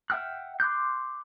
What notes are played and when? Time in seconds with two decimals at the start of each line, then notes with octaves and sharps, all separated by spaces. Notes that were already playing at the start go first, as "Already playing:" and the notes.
0.10 E5 F#5 G5 F6 F#6
0.60 C6 D6 F#6 G6